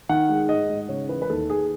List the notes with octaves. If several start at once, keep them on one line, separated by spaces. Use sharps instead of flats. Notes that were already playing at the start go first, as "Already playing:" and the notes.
D#3 F#5
G#3
G#2 D#5
G#2
C#3 C#5
E3 B4
B4
D#2 A4
D#2 G#4